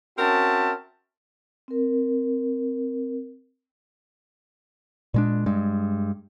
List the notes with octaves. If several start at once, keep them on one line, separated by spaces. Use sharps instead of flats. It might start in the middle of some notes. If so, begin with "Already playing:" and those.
C4 C#4 F#4 A#4 E5 A5
C4 A#4
A#2 G#3 D4
G2 G#3